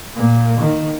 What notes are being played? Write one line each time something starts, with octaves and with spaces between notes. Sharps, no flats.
A#2 A#3
D#3